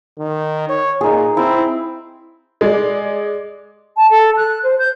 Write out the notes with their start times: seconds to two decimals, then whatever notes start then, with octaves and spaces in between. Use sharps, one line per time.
0.19 D#3
0.69 C#5
1.01 A#2 D#4 G#4
1.37 C4 E4
2.61 G#3 D5
3.96 A5
4.10 A4
4.37 F#6
4.63 C5
4.79 G6